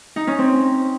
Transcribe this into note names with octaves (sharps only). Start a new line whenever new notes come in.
D#4
C#4
C4